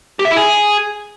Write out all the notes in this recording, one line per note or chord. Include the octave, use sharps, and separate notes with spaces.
G4
E5
E4
G#4